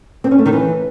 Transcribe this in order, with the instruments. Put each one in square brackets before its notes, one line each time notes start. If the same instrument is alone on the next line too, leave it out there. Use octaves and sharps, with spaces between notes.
[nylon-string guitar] C4
C#4
A3
D#3
E3